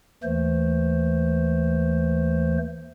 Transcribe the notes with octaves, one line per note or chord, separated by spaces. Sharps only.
D#2 E3 A3 C5